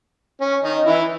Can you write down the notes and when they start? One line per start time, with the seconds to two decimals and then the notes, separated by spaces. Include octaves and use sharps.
0.41 C#4
0.64 D#3 D#4
0.87 E3 E4